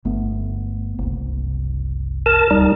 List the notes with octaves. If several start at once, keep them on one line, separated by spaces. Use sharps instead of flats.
G1 A3 B3
F#1 C2
A#4 A5
D1 G3 D#4